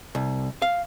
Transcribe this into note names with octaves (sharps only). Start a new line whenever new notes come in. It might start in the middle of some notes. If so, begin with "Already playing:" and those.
C2
F5